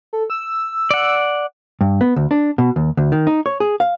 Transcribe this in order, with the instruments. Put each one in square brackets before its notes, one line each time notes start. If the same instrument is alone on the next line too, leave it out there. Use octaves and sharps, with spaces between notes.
[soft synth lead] A4
E6
[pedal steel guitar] D5 F#5
[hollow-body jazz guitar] G2
B3
D2
D4
B2
D#2
D2
D#3
D#4
C#5
G#4
F5